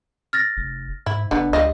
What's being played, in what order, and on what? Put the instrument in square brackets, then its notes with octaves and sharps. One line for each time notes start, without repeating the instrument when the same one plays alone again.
[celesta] F6 A6 A#6
[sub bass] F1
[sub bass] G#2 [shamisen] E4
[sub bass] F1 [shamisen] D3 B3 [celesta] D4
[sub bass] C#2 [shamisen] G3 F4 D#5